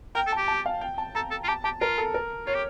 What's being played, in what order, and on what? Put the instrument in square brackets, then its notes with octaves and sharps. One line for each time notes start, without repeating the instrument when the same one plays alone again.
[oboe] A#4 [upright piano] G5
[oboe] A4
[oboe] G4 [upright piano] A5
[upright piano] A5
F5
G5
A5
[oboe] A4 [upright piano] A#5
[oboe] A4
F4
[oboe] G4 [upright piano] A5
[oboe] G4 [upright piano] A5
[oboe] F4 [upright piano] A#4
[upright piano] A4
A#4
[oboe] F4 [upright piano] C#5
[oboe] G4